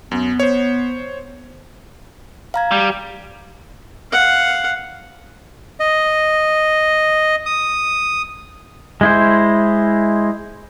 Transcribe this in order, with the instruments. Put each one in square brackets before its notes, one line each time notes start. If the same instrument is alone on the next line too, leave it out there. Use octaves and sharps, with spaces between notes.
[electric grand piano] F#2 [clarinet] B3
[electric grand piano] C5 C#5
[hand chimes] F5 A#5 G#6
[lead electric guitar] G3
[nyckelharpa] F5 F#5
[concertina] D#5
D#6
[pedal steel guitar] G#3 E4 C5